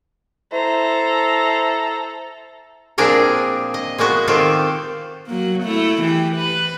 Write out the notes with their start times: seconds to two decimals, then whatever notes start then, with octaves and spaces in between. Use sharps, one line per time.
0.53 E4 A4 C5 A#5
2.98 A#2 F3 C4 D4 G#4 A#4
3.74 D#5
3.98 G#3 A#3 B3 F#4
4.28 D#3 C4 F4 G4 A4
5.27 F#3 A#3
5.63 A3 E4
6.01 E3 G4
6.36 B4